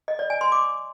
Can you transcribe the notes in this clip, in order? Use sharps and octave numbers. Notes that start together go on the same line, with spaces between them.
D#5
D5
G#5
C6
D6